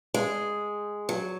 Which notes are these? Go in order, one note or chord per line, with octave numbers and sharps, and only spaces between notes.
G#3
F#3